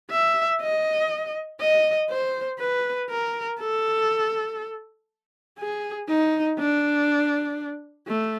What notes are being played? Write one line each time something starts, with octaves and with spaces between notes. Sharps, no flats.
E5
D#5
D#5
C5
B4
A#4
A4
G#4
D#4
D4
A3